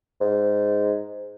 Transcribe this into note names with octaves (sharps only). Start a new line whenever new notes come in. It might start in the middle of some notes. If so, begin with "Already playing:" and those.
G#2